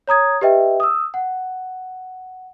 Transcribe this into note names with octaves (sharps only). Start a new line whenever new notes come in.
C#5 A#5 D#6 G#6
G4 B4 D#5 E5 G5
D#6 E6
F#5